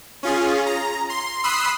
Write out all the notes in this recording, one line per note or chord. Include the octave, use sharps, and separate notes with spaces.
C#4 F4 G#4
A#5
C6
B5 C6 D#6 E6 F#6 C7